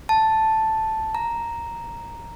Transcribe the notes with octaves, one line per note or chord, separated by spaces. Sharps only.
A5
A#5